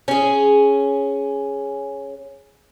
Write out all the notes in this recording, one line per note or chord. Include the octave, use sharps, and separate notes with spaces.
C#4 G#4